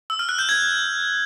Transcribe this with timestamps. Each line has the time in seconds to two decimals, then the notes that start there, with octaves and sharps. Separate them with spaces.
0.10 E6
0.19 F6
0.29 F#6
0.39 G6
0.49 G#6